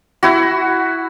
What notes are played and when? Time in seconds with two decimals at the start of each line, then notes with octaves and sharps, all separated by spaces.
0.23 E4 F#4